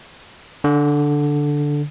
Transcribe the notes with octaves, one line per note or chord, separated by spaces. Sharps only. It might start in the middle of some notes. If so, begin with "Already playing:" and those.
D3